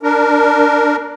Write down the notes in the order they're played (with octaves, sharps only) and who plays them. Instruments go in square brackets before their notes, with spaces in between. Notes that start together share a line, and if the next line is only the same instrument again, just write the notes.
[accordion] D4 A#4